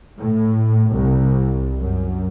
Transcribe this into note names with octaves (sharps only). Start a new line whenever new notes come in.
A2
C2
F#2